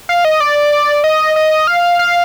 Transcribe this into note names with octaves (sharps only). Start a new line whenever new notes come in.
F5
D#5
D5
D#5
D#5
F5
F5